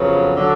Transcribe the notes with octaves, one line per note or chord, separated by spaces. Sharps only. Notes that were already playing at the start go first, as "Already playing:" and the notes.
Already playing: F2 C#3 F#3 B3
D3 F#3